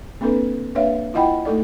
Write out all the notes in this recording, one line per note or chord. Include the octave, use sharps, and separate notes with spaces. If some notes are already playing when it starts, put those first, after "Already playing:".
A#3 C4 D4 A4 B4
A#3 D4 B4 C#5 E5 F5
E4 F4 D#5 F#5 G5 B5
A3 D#4 A4 D5